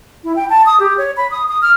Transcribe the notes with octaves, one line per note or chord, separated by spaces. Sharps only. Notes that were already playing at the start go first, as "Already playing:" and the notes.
E4
G5
A5
D#6
G4
C#5
B5
D#6
D#6
F6